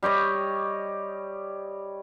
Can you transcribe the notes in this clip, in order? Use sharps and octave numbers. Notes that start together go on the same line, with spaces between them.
G3 G4 C#5 D#5